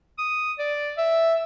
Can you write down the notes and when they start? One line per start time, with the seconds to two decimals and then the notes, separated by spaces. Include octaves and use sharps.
0.18 D#6
0.59 D5
0.98 E5